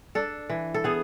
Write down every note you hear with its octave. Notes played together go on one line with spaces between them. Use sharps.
D4 A4
E3
A4
B3 G#4